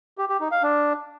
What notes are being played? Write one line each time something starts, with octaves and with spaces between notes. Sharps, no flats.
G4
G4
D#4
F5
D4